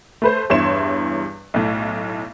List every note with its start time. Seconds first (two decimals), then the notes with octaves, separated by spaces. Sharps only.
0.22 A3 B4 C5
0.50 E2 G2 E4 C#5 C6 E7
1.54 B1 A2